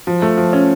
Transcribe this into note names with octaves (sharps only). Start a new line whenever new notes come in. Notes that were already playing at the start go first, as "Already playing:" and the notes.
F3
A3
F3
C#4